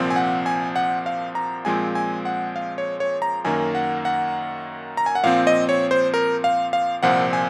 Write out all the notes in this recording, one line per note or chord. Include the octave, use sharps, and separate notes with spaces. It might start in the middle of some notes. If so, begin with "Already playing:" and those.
Already playing: C2 A#2 F3 C4
G#5
F#5
G#5
F#5
F5
A#5
A#2 F3 G#3 C4 G#5
G#5
F#5
F5
C#5
C#5
A#5
F#2 D#3 A#3 G#5
F#5
F#5
A#5
G#5
F#5
A#2 F3 C4 F5
D#5
C#5
C5
A#4
F5
F5
C2 A#2 F3 C4 F#5
G#5